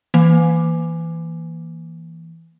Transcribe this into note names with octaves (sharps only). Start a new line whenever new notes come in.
E3 A#3